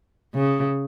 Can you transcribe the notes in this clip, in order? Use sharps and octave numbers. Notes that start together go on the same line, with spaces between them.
C#3